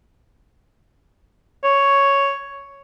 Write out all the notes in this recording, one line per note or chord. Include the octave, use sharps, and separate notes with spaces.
C#5